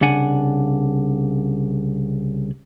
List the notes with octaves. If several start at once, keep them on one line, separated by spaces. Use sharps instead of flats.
C2 C#3 D4 F#5 G#5